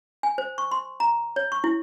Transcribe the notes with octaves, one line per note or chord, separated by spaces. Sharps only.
G#5
C5
C#6
C6
A#5
C#5
C#6
E4